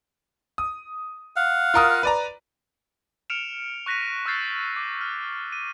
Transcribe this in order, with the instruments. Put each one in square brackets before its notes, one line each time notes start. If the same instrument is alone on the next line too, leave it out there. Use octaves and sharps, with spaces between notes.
[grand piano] D#6
[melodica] F5 F#5
[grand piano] F4 A#4 D#6
B4 D5 A#5
[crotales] F6 C#7 D7 E7 F7
C#6 F#6 A#6 B6 D#7
C#6 E6 F6 G6 A6 C7
D6
F6
D#7